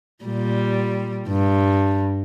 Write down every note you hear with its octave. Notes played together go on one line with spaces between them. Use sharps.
A#2 G3
G2